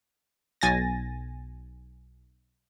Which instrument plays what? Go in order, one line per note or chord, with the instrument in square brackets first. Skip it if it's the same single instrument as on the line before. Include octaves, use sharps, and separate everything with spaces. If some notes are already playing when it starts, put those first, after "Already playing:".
[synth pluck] B1 G#5 A6 A#6